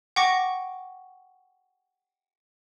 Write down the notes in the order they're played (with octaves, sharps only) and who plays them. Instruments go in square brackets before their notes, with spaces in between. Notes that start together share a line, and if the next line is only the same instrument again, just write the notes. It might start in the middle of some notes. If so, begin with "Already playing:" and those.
[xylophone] F#5 G5 C#6 D6 A#6